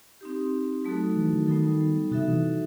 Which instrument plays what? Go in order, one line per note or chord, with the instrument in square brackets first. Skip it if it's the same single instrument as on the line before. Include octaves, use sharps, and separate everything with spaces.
[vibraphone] C4 D#4 G4
F#3 A3 D#4 F#4 A4
[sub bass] E3
D#3
[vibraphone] G3 B3 D#4 A4
[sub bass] C3 [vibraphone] D#4 F#4 A4 E5
[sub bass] E3